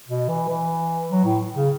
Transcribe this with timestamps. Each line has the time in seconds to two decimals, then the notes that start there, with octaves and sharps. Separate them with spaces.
0.08 B2
0.29 E3
0.49 E3
1.10 F#3
1.25 A2
1.56 C#3